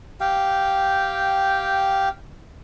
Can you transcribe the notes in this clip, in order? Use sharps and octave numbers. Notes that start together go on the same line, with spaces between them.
G4 F5 G5